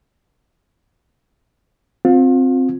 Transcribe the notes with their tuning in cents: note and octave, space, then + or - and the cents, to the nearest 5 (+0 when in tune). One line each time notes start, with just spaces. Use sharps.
C4 +0 F4 +35